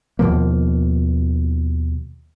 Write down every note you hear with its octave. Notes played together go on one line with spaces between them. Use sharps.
D#2 B2 F3 A#3